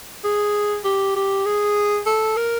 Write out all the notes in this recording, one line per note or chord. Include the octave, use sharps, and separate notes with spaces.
G#4
G4
G4
G#4
A4
A#4